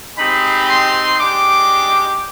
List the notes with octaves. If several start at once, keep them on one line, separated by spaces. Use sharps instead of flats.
G#3 C4 D#4 G4 B5
C6
G#3 D4 G4 D6